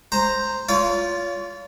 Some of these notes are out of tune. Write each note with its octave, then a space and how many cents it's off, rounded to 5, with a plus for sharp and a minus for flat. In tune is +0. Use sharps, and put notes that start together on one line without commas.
C5 +0 A#5 -5
F4 +0 C#5 +40 F5 -15